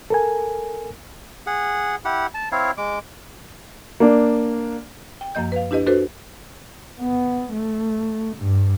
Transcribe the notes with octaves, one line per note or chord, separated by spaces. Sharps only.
A4 A#4 G#5
G#4 F#5
E4 G4 F#5
A5
C4 E4 C#5 F5
G#3 D6
A#3 D4
G5
F#2 F3 A#3 D#5 G6
B4 F5
D4 E4 G4 B4 D#5
D4 F#4 A4 B4 C5
B3
A3
G2